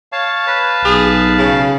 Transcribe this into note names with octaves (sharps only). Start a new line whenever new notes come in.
C#5 F5 A5
B4
B1 G#4
C#3